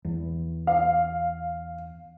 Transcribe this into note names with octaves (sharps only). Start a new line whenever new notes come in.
E2
F5